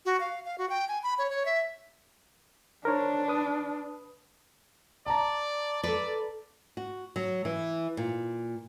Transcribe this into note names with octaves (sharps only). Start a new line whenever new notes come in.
F#4
F5
F5
F#4
G5
G#5
B5
C#5
C#5
E5
D4 A#4 C5 C#5
B4 D#6
D5 A5 A#5
A4 B4 D5
F#4
F#3
E3
A#2